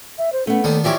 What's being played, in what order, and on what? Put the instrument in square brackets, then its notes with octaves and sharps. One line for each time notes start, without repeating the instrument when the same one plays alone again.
[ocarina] E5
C5
[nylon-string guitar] A3 B3 [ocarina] C#4
[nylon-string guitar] D#2 [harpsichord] D#3 B3 D4 [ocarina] A4
[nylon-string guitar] E3 F3 G4 [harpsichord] D4 E4 C#5 [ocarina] E5